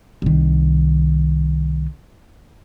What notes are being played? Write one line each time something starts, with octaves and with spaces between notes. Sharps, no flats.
C2 D#3